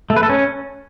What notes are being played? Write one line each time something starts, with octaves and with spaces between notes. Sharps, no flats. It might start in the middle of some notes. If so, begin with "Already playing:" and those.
A3
B4
A4
C#4